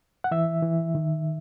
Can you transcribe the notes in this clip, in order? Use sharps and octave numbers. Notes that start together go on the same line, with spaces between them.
F#5
E3 E5
E3
D#3